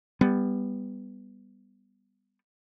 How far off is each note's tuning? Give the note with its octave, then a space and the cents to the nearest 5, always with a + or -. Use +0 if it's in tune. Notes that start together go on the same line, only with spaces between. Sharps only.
G3 +20 B3 +5